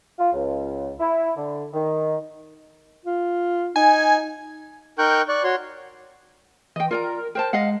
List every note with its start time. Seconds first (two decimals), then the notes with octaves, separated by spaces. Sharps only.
0.19 F4
0.33 C#2
1.00 E4
1.37 D3
1.74 D#3
3.05 F4
3.76 D#4 G#5
4.98 D#4 A#4 G5 C#6 F#6 G6
5.29 D5 C#6 F#6
5.44 F#4 C#5 C6
6.76 E3 D#5 G5
6.91 F4 A#4 D5 A#5
7.35 A#4 C5 G5 A5
7.53 G#3 D#5 F5 F#5